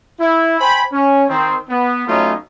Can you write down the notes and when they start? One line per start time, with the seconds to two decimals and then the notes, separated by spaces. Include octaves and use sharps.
0.20 E4
0.60 C5 G5 G#5 B5
0.92 C#4
1.29 D#3 C4
1.70 B3
2.08 F#3 A3 B3 C#4 D#4 F4